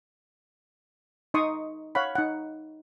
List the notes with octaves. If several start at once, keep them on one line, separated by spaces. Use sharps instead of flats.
D#4 D#5 C6 C#6 D#6
C#5 F5 F#5 B5
D#4 F#5